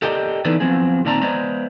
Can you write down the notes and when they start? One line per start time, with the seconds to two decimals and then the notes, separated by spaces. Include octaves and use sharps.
0.02 G4 A4 A#4 D5 D#5 G5
0.45 E3 B3 D#4 A4 B4 D5
0.60 F3 F#3 B3 C4 G#4
1.05 A#2 D#3 C4 D5 A5 A#5
1.21 G#3 B3 C5 D5 A#5